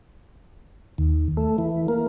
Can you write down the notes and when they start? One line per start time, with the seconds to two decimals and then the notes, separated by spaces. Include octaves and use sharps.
0.98 D#2
1.37 A3
1.58 E3
1.88 A#3